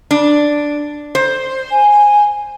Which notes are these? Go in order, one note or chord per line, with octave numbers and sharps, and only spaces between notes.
D4
C5
G#5